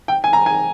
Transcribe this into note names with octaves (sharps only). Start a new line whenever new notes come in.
G5
G#5
A#5
G#5